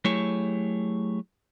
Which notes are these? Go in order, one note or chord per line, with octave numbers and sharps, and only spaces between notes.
F#3 A3 E4 G4 G#4 C#5